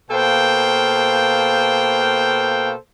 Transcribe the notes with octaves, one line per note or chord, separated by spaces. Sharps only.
B2 A#3 A4 C5 F5 G5